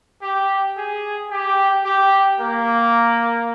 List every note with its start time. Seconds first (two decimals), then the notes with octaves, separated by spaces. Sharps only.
0.22 G4
0.77 G#4
1.31 G4
1.85 G4
2.40 A#3